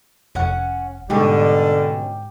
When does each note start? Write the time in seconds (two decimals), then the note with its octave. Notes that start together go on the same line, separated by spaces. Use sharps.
0.35 F1 C#4 F#5
1.10 G#2 B2 D3 G3 C#4 G4